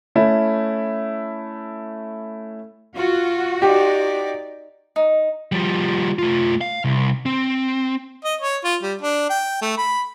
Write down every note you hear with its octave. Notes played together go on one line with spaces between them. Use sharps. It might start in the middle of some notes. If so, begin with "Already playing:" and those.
A3 C#4 E4
F4 F#4
D#4 G4 D5
D#4
F3 G3
A3 F4
F5
C2
C4
D#5
C#5
F4
G3
D4
G5
A3
B5